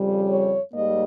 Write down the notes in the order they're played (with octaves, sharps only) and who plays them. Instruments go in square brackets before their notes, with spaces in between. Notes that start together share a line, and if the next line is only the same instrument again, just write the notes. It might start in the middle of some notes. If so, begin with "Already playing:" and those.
Already playing: [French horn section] F2 C#3 G3
C#5
G#2 G3 A#3 D#5